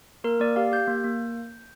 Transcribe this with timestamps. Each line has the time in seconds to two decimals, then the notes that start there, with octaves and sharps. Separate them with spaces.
0.24 A#3 A#4
0.40 A#3 D5
0.56 G4 F5
0.72 G4 G6
0.88 A#3
1.04 A#3